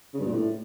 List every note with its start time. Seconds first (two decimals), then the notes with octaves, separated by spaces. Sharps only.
0.14 C#3
0.20 G2
0.26 A#2
0.32 A2